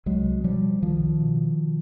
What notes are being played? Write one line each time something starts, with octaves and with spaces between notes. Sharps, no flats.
C2 F#3 G#3
B2 F3 G3
C2 D#3 F3
B2